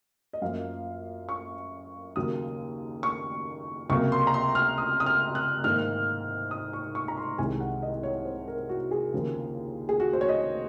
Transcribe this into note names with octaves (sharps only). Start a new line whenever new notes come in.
D#5
F#2 F3 A#3 F5
C#6
D#2 C#3 F#3 A#3 D#6
C#6
C#2 C3 F#3 A#3 C#6
C6
A#5
C6
F6
D#6
D#6
F6
F#6
G#2 D#3 A#3 F6
D#6
C#6
C#6
A#5
C6
C2 C3 D#3 G#3 G#5
F#5
D#5
C#5
C5
A#4
F#4
G#4
D#2 C#3 F3 A#3
G#4
F#4
C5
C#5
D#5